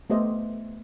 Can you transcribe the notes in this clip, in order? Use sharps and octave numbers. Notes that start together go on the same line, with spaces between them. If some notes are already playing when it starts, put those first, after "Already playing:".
A3 B3 G4 C5 D#5 E5